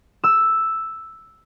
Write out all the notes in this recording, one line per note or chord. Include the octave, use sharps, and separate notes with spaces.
E6